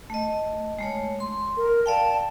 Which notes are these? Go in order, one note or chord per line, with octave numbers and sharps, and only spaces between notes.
A3 D#5
G#3 A3 C#5
C6
A#4
D5 F5 G5 A5